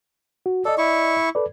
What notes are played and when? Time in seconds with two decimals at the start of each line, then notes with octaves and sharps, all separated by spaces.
0.46 F#4
0.65 A4 D5 D#5
0.78 E4 C#6
1.35 A4 B4 D5